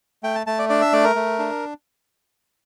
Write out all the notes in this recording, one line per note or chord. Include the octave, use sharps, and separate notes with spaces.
A3 G5
A5
A3 A5
D5
D4 D5
E5
A3 D5
A#4
A3
D4